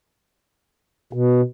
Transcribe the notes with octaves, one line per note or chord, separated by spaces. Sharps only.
B2